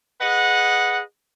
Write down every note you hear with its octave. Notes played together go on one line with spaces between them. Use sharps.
G#4 B4 D#5 F#5